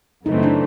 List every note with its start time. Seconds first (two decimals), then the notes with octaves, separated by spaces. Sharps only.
0.26 F#2 C#3 E3 A3 C4 D#4
0.43 D4